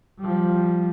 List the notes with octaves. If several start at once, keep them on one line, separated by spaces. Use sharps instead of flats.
F3 G3